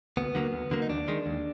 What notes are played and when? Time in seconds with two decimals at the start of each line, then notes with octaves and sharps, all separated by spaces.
0.17 D2 B3
0.35 D3 F#3 A#3
0.53 D2
0.71 D3 F#3 A#3
0.82 D#4
0.89 D#2 D4
1.08 D#3 G#3
1.26 D#2